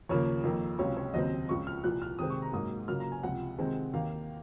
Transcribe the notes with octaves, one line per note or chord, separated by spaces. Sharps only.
D#2 C#3 F3 A#3 C#5
F2 D#3 A#3
C#2 C3 F#3 C#4 F4 C#5
C#5
D#2 C#3 F#3 C4 D#5
C#2 C#3 F3 C#6
F6
C2 A#2 F3 F#6
F6
C3 D#3 G#3 C4 D#6
C#6
A#5
G#2 F#3 A#3 D#6
C#3 F#3 A#3 F4 F6
A#5
G#5
C#2 C3 F3 F#5
C3 D#3 G#3 C4
D#2 D#3 A#3 F5